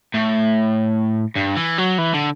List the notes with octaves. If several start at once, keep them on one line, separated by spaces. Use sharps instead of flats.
A2
G2
E3
F#3
E3
D3